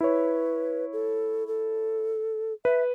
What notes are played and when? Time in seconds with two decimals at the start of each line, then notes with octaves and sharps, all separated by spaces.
0.01 E4 B4 C#5
0.93 A4
1.48 A4
2.65 B4 E5